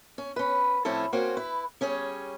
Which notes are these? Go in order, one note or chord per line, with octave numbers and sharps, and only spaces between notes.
C#4
C#4 B4
A2 F3 C4 C#4 E4 A4
A#3 C4 C#4 F#4 C5 C#5
E4 B4
G3 C#4 G#4 C#5